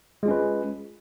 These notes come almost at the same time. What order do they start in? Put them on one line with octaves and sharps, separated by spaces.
G#3 F4 C#4 B4